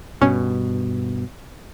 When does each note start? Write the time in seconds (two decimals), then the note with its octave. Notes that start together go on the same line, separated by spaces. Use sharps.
0.22 G2 B2 C#4